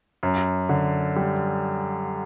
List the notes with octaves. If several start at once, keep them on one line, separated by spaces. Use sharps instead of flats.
F#2
D3
G3